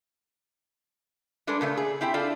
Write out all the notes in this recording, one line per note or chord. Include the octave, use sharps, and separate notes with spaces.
G3 G#3 D4 A4 B4
A#2 C#3 A3
G#4
C4 E4 G4 G5
D4 F4 A4 D5